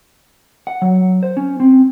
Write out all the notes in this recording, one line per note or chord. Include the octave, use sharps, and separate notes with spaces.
F#5
F#3
C5
C#4
C4